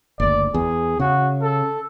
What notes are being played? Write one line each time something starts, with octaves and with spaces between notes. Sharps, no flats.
F#1 D2 D5
E2 G#4
C#3 F#4
A4